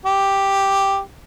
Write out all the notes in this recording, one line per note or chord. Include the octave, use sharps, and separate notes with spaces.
G4